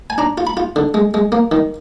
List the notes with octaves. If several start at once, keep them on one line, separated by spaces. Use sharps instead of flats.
G#5
D4 A#5
F4
B5
F4
D3
G#3
G#3
A#3
D#3